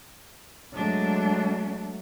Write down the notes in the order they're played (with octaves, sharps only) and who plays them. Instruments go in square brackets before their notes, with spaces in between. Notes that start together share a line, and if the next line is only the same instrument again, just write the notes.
[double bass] F#3 A3 [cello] G#3 D4